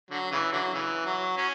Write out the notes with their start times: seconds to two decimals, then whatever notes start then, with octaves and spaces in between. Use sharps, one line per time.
0.11 D3 F#3
0.32 C#3 E3
0.53 D3 F#3
0.74 C#3 E3
1.06 F#3
1.37 F#3 C#4